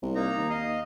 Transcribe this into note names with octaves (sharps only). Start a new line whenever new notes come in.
C2
A#3 D#4 A#5
D#2
D#5 F5